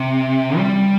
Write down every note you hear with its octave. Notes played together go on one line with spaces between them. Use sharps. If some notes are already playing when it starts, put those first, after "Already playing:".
Already playing: C3
G3